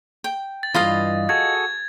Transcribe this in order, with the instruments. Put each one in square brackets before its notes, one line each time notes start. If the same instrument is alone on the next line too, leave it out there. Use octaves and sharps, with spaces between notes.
[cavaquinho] G5
[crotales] A6
[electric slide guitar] G2 E3 [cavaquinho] F4 D#5 F5
[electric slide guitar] F#4 G#4 A4 [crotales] G#6